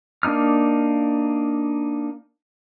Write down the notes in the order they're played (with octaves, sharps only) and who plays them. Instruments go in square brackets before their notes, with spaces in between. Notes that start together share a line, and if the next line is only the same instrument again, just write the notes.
[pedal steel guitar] A#3 D4 D#4 F6